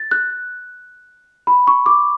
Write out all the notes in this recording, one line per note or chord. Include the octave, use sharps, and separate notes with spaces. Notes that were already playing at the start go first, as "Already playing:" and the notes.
Already playing: A6
F#6
B5
C#6
D6